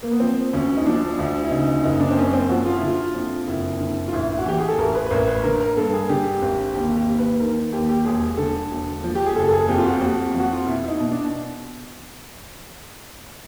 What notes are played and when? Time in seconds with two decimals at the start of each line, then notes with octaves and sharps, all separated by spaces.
0.03 A#3
0.12 B3
0.20 F3 C4
0.53 D2 C#4
0.77 D#4
0.86 F3 D4
1.19 D2
1.43 E4
1.51 C#3 D#4
1.67 D#4
1.83 F#1 D#4
2.00 D4
2.11 C4
2.17 F#2 C#4
2.33 C4
2.49 F3 F#4
2.65 F4
2.76 E4
2.82 D3
2.88 F4
3.14 F2
3.47 F#1 E4
3.80 D3
4.08 F4
4.13 A1 E4
4.38 F#4
4.46 E3 G4
4.59 G#4
4.68 A4
4.78 A1 A#4
4.95 B4
5.06 B4
5.11 A1 A#4
5.27 B4
5.43 D3 A#4
5.60 A#4
5.77 G2 A4
5.93 G#4
6.09 D3 G4
6.42 G#1
6.74 D#2 G4
6.96 G4
7.08 D#2
7.19 B4
7.40 D#3 A#4
7.72 D#2 G4
7.89 G4
8.05 E1 G#4
8.37 D3 A4
8.71 E1
9.04 F3
9.15 G4
9.26 G#4
9.36 F#1 A4
9.48 A4
9.53 G#4
9.68 F2 G4
9.78 F4
9.85 F#4
9.94 G4
10.01 F2 F#4
10.34 F2
10.40 F#4
10.53 F4
10.66 B2 E4
10.84 E4
10.88 D#4
11.00 B2
11.11 D4